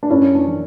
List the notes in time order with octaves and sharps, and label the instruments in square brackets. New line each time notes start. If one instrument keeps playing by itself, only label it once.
[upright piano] D4
F#2 C#4 E4
D4
E3